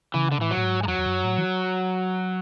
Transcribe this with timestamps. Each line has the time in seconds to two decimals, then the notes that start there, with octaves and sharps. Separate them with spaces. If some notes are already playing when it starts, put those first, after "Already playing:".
0.14 C#3 E3
0.32 D3
0.39 A2 E3
0.51 F#3
0.57 A2
0.63 G#2
0.83 G#3
0.87 E2 F#3
0.98 E2
1.06 F#2
1.24 A2
1.38 E3